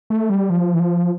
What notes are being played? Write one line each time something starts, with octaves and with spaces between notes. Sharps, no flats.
A3
G3
F3
E3
F3